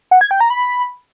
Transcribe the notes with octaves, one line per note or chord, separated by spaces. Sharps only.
F#5
G#6
G5
A#5
B5